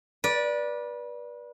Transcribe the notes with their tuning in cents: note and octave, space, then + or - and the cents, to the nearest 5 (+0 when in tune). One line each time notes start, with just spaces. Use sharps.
B4 -30 D5 +0